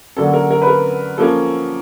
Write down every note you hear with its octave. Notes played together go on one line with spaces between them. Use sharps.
D3 F#3 A#3 C#4 A4
A#4
A#4
B4
A#4
F3 A#3 C#4 A4